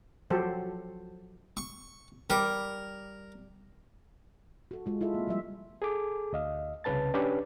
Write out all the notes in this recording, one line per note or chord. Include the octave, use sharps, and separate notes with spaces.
F3 F#3 F#4 G4 A4 C5
C#6
G3 A#4
F#4 A4
G#3 F4
E4 F4 A4 E5
A#3 C4
F3 G3 E5
G#4 A4 D6
D2 D#5 F5
C2 C#3 C#4 B4 A5 A6
C#4 D4 G4 B4 D5